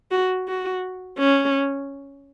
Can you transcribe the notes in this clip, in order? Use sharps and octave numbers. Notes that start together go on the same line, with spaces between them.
F#4
F#4
C#4